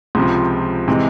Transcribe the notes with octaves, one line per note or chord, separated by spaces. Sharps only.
C#2 C3 F3
C3 E3 G#3